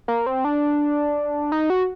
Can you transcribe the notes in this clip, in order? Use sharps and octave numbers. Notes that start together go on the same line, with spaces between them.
A#3
C4
D4
D#4
F#4